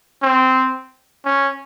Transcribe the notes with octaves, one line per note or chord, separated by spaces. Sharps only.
C4
C#4